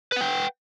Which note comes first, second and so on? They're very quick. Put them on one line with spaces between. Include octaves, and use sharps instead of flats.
B4 F#5 G5